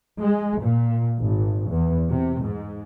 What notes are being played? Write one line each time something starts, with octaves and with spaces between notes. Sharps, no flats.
G#3
A#2
G#1
E2
C3
G#2